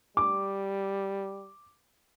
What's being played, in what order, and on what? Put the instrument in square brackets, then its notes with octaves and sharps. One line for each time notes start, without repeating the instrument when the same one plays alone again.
[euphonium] G3 [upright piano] D6